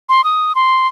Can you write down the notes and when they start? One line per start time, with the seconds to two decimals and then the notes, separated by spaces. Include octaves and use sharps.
0.09 C6
0.24 D#6
0.55 C6